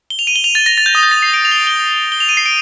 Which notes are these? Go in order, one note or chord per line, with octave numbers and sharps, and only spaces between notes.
G7
F7
D#7
G7
F7
A6
A#6
A6
G6
D#6
G6
A6
C7
D7
F7
G7
F7
G7
G7
F7
D#7
C7
D7